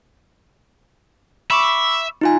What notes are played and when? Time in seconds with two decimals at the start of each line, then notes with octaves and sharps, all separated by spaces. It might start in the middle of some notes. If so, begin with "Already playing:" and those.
1.51 E5 B5 C#6 D6
2.21 D#4 F4 G#5